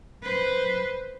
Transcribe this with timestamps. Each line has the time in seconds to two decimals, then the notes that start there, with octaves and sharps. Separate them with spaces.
0.23 B4 C5